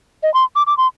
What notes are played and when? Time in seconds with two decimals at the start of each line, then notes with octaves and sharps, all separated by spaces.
0.23 D#5
0.34 C6
0.56 D6
0.67 D6
0.77 C6